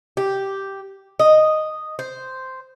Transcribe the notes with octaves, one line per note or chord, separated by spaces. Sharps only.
G4
D#5
C5